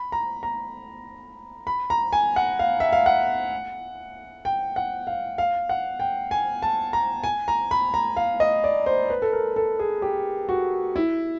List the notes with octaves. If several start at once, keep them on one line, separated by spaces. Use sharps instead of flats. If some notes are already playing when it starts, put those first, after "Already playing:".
Already playing: B5
A#5
A#5
B5
A#5
G#5
F#5
F5
E5
F5
F#5
G5
F#5
F5
F5
F#5
G5
G#5
A5
A#5
G#5
A#5
B5
A#5
F5
D#5
D5
C5
B4
A4
A#4
A4
G#4
G4
F#4
E4